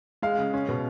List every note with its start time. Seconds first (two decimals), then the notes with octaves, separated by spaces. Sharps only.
0.22 G#3 F5
0.38 C#3
0.53 C#4
0.69 B2